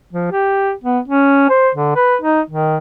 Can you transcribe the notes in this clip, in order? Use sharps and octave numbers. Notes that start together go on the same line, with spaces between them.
F3
G4
B3
C#4
C5
D3
B4
D#4
D#3